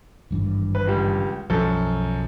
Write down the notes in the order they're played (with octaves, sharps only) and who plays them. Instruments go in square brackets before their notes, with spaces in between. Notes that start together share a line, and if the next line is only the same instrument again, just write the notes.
[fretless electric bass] G#1 G2 E3
[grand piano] B4
C#2 G3
[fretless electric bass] B1 F3 [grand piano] F#2 A4